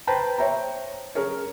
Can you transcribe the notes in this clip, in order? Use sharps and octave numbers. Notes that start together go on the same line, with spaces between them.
B4 C5 G5 A5 A#5
C5 C#5 E5 G5 A#5
C#4 G#4 A#4 C#5